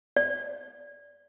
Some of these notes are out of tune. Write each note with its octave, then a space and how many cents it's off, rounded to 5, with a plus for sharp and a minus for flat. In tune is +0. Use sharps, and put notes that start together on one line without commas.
D5 -25